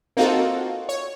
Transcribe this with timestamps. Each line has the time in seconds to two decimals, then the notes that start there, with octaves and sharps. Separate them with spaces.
0.17 A#3 C4 D#4 F4 F#4 A4
0.89 C#5